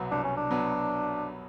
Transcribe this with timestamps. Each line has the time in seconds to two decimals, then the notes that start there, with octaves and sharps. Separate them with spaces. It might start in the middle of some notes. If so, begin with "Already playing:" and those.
Already playing: C2 B2 F#3 B3
0.12 C2 D4
0.24 C#4
0.37 D4
0.51 B2 F#3 B3